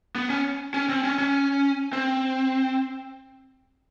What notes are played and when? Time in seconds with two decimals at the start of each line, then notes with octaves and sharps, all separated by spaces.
0.15 B3
0.30 C#4
0.74 C#4
0.89 C4
1.05 C#4
1.19 C#4
1.93 C4